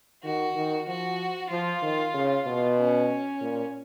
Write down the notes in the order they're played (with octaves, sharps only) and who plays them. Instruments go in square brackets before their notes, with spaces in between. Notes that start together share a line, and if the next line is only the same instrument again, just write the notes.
[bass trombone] D#3 [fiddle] F#4
[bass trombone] D#3
[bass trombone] F3 [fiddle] F#4
[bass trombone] F3 [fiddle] F4
[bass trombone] D#3
C#3
B2
[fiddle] C#4
[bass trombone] A#2